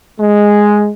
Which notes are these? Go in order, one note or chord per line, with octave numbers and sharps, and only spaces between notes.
G#3